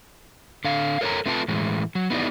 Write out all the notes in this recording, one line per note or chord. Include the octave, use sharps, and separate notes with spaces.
D3 F5
A4 A#4 C#5 E5 G5 A#5
A3 C4 F4 B4 G5 A5
A2 E3 G#3
F#3
B3 D#4 E4 G4 D5